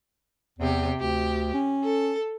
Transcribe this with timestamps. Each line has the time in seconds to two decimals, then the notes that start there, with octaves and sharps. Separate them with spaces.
0.59 E2 C3 G4
1.00 D2 G4
1.54 C#4
1.84 A4